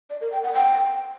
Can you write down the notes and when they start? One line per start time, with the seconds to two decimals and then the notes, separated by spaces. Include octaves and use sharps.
0.10 D5
0.21 A#4
0.32 G5
0.43 F#5
0.54 G5